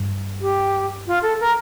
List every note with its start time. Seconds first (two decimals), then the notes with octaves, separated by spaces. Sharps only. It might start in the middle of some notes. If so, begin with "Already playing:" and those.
Already playing: G2
0.40 G4
1.07 F4
1.22 A4
1.40 A#4